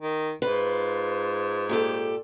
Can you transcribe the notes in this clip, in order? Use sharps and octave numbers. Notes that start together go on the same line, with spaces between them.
D#3
G#2 F4 B4
A#2 G4 A4